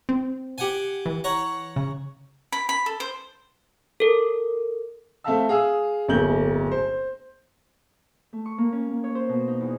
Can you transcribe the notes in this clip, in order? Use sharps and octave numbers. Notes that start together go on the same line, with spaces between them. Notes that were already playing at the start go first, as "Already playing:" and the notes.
C4
G4 F#5 G#5
E3
C#5 F#5 A#5
C#3
B5
B5
A4
C5
A4 A#4
A3 C4 E5 F5 A5 E6
G#4 F5 D#6 E6
D1 G1 A#3 G6 F#7
C5
A3
C#6
A#3
C#4
A#3
C#5
C5
B2
D#4
E2